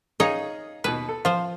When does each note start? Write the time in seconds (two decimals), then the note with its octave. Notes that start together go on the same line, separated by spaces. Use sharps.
0.20 D#4 G#4 C#5 D#5 F5
0.84 D#2 B2 B3 B4
1.09 A4
1.25 F3 C5 F5